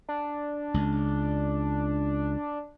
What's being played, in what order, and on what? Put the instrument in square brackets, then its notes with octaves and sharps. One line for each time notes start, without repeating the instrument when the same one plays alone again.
[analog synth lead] D4
[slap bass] C#2